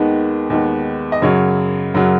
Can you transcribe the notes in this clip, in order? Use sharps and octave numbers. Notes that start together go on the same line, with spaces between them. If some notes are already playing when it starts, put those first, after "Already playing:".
Already playing: D#2 D#3 G#3 B3
D#2 D#3 G#3 B3
D#5
F#2 C#3 F#3 C#5
F#2 C#3 F#3